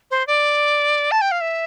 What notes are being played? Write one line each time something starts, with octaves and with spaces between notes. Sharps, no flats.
C5
D5
A5
G5
F5
E5